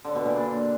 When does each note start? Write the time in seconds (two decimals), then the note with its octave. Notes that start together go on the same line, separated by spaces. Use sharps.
0.05 D3
0.15 B2
0.26 A#2
0.36 D4